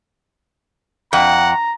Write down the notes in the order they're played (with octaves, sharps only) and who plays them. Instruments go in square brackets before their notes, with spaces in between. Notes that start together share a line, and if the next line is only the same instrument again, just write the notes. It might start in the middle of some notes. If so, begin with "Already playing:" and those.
[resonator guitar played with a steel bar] F2 [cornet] F#5 [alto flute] G5 [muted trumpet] A#5